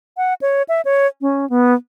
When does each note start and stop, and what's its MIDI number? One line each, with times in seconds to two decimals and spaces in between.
0.17 0.34 78
0.42 0.63 73
0.69 0.81 76
0.85 1.07 73
1.21 1.48 61
1.50 1.74 59